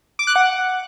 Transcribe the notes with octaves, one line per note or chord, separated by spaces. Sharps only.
D6
F#6
F#5